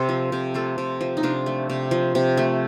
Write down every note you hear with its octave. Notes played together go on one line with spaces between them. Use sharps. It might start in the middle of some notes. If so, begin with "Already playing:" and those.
Already playing: C3 A4 C5
F3
C3
A3 F4 A4
C3
F3
D#4
C3 D4 F4
A3
C3
F3
C3
A3